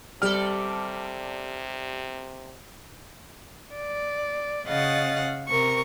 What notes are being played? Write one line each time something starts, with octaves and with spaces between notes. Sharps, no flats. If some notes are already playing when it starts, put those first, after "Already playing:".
C3 G3 A4 D5 F6
D5
C#3 D#5 F5 F#5 A6
C3 A#4 C#6